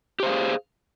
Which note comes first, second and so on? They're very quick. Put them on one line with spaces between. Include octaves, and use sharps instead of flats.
G4 C5 F5 G#4